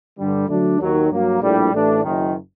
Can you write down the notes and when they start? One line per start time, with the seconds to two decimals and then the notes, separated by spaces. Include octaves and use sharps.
0.17 G2 D3 G3
0.48 D2 D3 F#3 A3 D4
0.80 D#2 D#3 F#3
1.10 G2 F#3 A#3
1.41 A#1 A2 G3
1.73 A1 A2 A3 D4
2.03 F#1 F#2 D#3